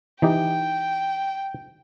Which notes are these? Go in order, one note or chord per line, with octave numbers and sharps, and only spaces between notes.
E3 D#4 G4 G5